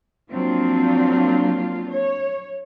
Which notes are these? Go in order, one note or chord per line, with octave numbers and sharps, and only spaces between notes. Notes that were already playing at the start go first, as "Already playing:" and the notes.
F3 F#3 A#3 C4 D4 F4
C#5